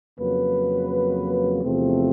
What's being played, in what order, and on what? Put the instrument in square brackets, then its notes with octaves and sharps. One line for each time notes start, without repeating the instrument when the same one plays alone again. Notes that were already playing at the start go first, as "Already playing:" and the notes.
[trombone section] F2 C#3 F#3 A#3 B4
E2 C3 F3 A3 C4